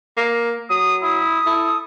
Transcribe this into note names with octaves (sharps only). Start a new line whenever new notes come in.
A#3
F#3 D#6
E4 D#6
E4 A4